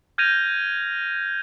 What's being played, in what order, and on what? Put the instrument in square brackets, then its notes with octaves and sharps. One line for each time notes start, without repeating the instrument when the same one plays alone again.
[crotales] F6 G6 G#6 A#6 D#7 F7